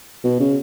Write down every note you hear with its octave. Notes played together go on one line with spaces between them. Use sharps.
B2
C#3